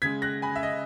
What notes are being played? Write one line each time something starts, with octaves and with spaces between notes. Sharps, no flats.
C#3 G#3 G#6 B6
F#6 A#6
G#5 B5
E5
D#5